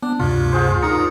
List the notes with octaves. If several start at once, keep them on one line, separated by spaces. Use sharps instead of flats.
B3 D4
D2 G2 C3 F4
F4 G#4 C5
D#4 A#4 A#5 D#6 C#7